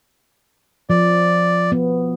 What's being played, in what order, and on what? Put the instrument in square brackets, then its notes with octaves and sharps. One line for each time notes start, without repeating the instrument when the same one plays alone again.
[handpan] F3 [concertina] D5
[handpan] B3